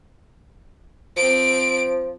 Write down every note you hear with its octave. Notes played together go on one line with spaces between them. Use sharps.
F3 C4 D7